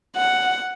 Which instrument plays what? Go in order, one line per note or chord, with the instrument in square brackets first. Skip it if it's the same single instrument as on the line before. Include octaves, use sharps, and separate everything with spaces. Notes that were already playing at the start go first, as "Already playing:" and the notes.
[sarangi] F#5